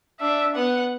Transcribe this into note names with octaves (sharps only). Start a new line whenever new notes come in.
D4 E5
B3 F#5